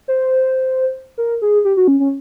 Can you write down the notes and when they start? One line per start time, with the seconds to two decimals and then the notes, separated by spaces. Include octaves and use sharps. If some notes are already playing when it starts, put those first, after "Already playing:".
0.08 C5
1.18 A#4
1.42 G#4
1.65 G4
1.77 F#4
1.88 C#4
2.00 C#4